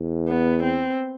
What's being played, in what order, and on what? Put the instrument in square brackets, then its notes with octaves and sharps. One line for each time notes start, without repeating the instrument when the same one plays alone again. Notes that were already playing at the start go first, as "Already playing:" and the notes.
Already playing: [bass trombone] E2
[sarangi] B3
C4